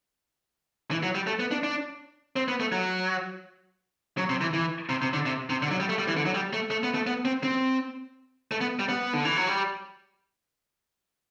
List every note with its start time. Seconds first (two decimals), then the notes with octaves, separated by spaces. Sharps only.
0.91 E3
1.03 F#3
1.15 G3
1.27 A3
1.40 B3
1.51 D4
1.63 D4
2.36 C4
2.48 B3
2.60 A3
2.72 F#3
4.18 F#3
4.29 C3
4.41 E3
4.54 E3
4.89 C3
5.02 C3
5.13 D3
5.26 C3
5.50 C3
5.62 D3
5.71 F#3
5.80 G3
5.89 A3
5.99 G3
6.08 E3
6.17 D3
6.25 F#3
6.34 G3
6.53 A3
6.71 A3
6.83 B3
6.95 A3
7.07 B3
7.25 C4
7.43 C4
8.51 A3
8.61 B3
8.79 G3
8.89 B3
9.13 D3
9.25 E3
9.37 F#3
9.49 G3